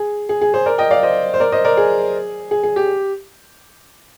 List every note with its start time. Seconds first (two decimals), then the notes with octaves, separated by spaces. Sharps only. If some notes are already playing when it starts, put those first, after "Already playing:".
Already playing: G#4
0.29 G#4
0.41 G#4
0.54 G#4 C5
0.66 A#4 D5
0.78 D#5 G5
0.91 D5 F5
1.03 C5 D#5
1.34 C5
1.40 A#4 D5
1.52 C5 D#5
1.65 A#4 D5
1.77 G#4
2.51 G#4
2.63 G#4
2.76 G4